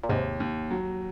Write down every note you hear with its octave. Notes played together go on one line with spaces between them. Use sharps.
A#2
D#2 G#2 C3
D#2
F#3